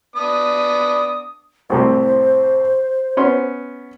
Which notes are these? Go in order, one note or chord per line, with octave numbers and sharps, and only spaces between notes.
B3 D4 D#6
C2 A2 C3 C5
B3 C#4 C6